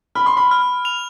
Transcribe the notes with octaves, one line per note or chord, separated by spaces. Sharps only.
B5 F6
C6
B5
F6
F7